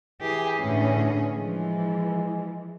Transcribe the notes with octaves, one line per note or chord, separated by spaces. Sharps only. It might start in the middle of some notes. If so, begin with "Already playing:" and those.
E3 G4 G#4
A2 D3 C#4 G#4
E3 F3 G#3